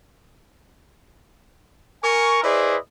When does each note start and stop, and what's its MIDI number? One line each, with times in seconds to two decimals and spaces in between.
2.04 2.43 70
2.04 2.43 80
2.04 2.43 85
2.43 2.77 64
2.43 2.77 68
2.43 2.77 71
2.43 2.77 72
2.43 2.77 74
2.43 2.77 75